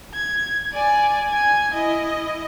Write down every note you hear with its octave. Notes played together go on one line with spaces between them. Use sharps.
G#6
D5 G#5
G#5 G#6
E4 D#5